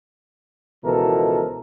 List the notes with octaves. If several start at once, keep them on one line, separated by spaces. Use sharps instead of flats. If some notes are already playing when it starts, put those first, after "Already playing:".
C#2 B2 E3 F3 A4 A#4